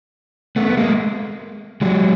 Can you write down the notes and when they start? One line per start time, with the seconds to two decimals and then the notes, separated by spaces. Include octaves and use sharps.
0.56 A3 B3
0.70 B3
0.77 G#3 A#3
1.81 F#3 G#3